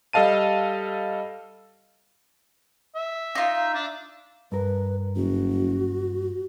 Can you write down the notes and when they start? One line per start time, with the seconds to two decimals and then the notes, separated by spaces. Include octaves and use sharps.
0.13 G3 A4 D#5 F5 A5 D#7
2.95 E5
3.35 D#4 F4
3.74 D4
4.52 G2 A#4 B4
5.16 F#1 F#4